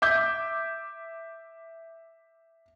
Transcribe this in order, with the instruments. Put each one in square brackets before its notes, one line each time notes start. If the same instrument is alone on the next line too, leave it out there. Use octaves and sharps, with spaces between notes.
[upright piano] E5 D6 G6